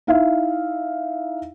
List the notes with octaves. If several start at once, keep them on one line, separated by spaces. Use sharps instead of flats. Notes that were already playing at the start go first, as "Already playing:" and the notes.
D#4 E4 E5 F5